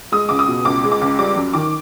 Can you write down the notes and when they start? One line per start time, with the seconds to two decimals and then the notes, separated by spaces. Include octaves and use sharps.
0.12 G#3 D#6
0.29 C#2 D6
0.39 D#6
0.48 B2
0.65 C#2 D6
0.84 G#3
0.92 D6
1.01 C#2
1.19 G3 D6
1.36 F#2
1.53 D#3 D6